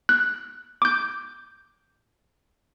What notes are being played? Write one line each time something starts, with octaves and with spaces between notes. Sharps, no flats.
F#6
D6 G6